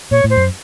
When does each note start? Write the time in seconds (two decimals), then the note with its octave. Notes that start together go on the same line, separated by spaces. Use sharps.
0.11 A#2 C#5
0.24 A2
0.30 C5
0.37 F#2